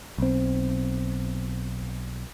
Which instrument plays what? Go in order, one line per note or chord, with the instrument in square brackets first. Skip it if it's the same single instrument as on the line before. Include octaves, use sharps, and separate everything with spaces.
[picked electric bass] B1 C4